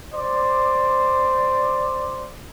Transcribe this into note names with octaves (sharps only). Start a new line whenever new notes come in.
C5 D5